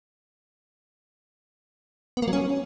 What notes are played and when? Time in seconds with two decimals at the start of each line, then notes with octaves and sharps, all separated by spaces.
2.17 B3
2.22 A#3
2.28 F#3
2.33 C#4